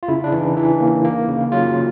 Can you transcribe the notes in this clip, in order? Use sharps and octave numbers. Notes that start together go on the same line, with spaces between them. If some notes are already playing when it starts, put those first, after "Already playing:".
F4
C#3 E4
D4
E3
D#4
E3
A#3
A#3
C#3
F#3 F4